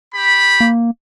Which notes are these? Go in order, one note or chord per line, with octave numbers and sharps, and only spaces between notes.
G4 B5
A#3